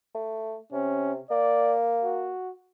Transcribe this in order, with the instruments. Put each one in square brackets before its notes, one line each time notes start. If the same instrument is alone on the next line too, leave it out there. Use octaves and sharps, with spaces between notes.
[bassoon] A3
[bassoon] C3 [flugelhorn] C#4
[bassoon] A#3 [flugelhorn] D5
[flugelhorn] F#4